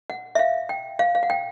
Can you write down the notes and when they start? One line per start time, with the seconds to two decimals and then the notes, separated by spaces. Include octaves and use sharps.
0.10 F#5
0.35 E5
0.39 F5
0.69 G5
0.99 F5
1.15 F5
1.23 F#5
1.30 G5